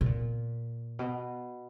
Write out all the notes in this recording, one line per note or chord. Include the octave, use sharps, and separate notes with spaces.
B2
A#2
B2